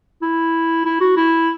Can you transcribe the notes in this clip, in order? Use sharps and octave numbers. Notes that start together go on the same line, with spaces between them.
E4
E4
F#4
E4